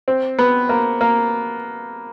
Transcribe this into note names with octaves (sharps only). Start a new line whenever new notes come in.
C4
B3
A#3
A#3